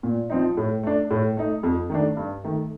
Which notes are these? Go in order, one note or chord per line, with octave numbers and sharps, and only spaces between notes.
A#2
F3 C4 D#4
A2
A3 D4
A2
A3 D#4
F2
D#3 A3 D4
G2
D#3 A3